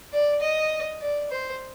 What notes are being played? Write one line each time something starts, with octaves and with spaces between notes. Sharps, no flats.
D5
D#5
D5
C5